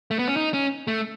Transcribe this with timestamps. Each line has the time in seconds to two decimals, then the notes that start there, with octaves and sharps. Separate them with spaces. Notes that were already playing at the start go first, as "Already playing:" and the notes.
0.11 A3
0.19 B3
0.28 C#4
0.37 D#4
0.54 C#4
0.87 A3